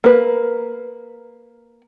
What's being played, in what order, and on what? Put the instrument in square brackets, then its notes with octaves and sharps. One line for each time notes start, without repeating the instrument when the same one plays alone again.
[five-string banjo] A#3 B4